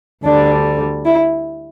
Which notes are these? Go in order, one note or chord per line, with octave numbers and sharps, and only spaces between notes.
D2 D3 G3 D4
E4